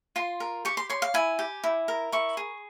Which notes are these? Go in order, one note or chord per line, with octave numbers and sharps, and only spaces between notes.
F4 C6
A#4
G4 C#6
C6
C#5 C6
F5
E4 G#5
G4
E4
A#4
E4 C#6
G#4